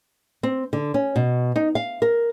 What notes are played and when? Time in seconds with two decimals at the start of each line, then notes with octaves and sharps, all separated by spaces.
0.43 C4
0.73 D3
0.94 C#4
1.16 B2
1.56 D#4
1.75 F5
2.02 A#4